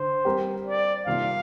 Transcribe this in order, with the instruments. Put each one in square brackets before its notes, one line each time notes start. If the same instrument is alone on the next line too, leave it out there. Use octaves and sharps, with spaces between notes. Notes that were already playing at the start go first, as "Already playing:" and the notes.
Already playing: [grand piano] D3 [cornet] C5
[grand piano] G3 C4 G4 A#4
[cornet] D5
[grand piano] C3 D#3 G3 A#3 F4 [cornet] F5